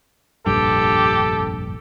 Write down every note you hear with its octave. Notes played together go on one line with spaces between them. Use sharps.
F1 A#1 G2 G4 A4